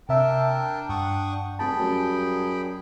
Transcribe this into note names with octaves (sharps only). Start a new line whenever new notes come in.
C3 D4 A#4 E5 G5 A5 E6
G2 F#5 C#6 D#6
F1 G3 G#4 G5 A5 B5
F#2